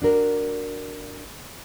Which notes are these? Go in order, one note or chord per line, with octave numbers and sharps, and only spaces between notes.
D4 F#4 A#4